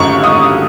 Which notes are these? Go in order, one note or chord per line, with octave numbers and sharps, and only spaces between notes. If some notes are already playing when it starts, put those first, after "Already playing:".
Already playing: G#1 F#2 D3 C#6
D#6